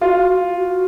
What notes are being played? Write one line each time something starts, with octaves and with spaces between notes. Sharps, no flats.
F4 F#4
F#4